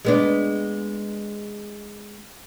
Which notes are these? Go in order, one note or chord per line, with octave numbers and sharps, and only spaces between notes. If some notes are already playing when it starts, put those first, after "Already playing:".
G#3 B3 D4